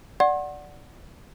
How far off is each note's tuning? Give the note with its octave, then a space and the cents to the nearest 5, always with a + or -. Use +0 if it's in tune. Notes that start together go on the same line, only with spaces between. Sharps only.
D5 +0 F#5 +0 C6 +40